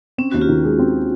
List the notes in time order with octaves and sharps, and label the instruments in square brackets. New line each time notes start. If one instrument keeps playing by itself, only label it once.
[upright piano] C4 [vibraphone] C#4
[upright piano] D#2 [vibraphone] F#4
[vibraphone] F4 G4
[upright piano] D#3
G#3
C4